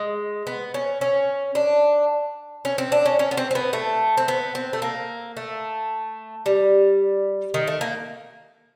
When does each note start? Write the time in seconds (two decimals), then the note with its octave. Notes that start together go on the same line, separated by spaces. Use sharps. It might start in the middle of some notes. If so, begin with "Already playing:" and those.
Already playing: G#3
0.47 B3
0.74 C#4
1.01 C#4
1.55 D4
2.65 C#4
2.78 C4
2.92 D4
3.06 C#4
3.19 C#4
3.31 B3
3.37 C4
3.51 C4
3.55 B3
3.73 A3
4.17 C4
4.28 B3
4.55 C4
4.73 A3
4.82 A#3
5.37 A3
6.46 G3
7.54 D#3
7.68 A3
7.81 A#3